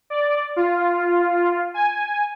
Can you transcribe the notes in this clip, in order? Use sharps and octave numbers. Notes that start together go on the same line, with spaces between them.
D5
F4
G#5